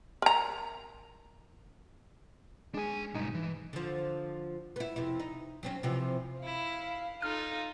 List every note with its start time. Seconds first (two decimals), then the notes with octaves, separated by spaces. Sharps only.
0.22 A#4 A#5
2.74 G#3 D4 G#4 G#5
3.14 B1 G2 G#3 D#4
3.34 E3
3.73 D3 F3
4.76 B3 E4
4.96 F2 C3 E4
5.20 D#4
5.63 F#3 C4 C#4
5.83 C3 E3 F3
6.43 E4 F5
7.22 D#4 F4 A4 F6